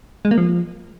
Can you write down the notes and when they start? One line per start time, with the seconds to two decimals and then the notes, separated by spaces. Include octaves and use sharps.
0.25 G#3
0.31 A#3
0.38 F3